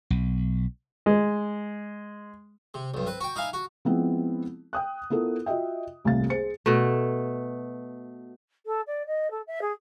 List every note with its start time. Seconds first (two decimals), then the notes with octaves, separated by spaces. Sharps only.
0.10 B1
1.06 G#3
2.74 C3
2.94 B1 G2
3.06 C4 B4
3.20 F#4 G5
3.36 D#4 E4 F5 G#5
3.53 F#4
3.85 F3 G#3 B3 C4 E4
4.73 G5 D#6 F#6
5.10 B3 E4 F4 A4 A#4
5.46 F4 F#4 D#5 E5 G5
6.05 D#1 C2 A2 F5 A6
6.30 G#4 C5 C#7
6.66 B2 A3
8.66 A4
8.87 D5
9.07 D#5
9.31 A4
9.47 E5
9.62 G#4